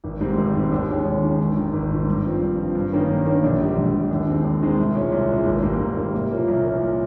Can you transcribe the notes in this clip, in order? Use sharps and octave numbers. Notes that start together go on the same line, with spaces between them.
G#1
G#2 G3 C4
G#1
G#2 G3 C4
D#2
D#3 G#3 C#4
D#2
D#3 G#3 C#4
G#1
G#2 D#3
G#1
G#2 D#3
G2
F3 C4
G2
F3 C4
G2
D#3 A#3 C#4
G2
D#3 A#3 C#4
A#1
G#2 G3
A#1
G#2 G3
D#2
D#3 G#3 C4
D#2
D#3 G#3 C4
C2
A#2 G#3 C#4
C2
A#2 G#3 C#4
G#1
G#2 G3 A#3
G#1
G#2 G3 A#3
C2
A#2 F3 A#3 C#4
C2
A#2 F3 A#3 C#4